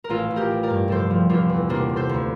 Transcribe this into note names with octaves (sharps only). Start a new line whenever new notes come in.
A#4
A1 F4 A4
A1
G4 A#4
A1
A#4 D5
G2
F1 A4 C5
F3
F1 D4 F4
E2
C3 A#3 D4
C3
A4 C5
D2